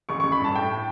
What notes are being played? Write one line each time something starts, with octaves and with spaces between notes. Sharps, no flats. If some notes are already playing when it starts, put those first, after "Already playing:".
A1 C#6
A1 C#6
B5
G2 A5
A2 G5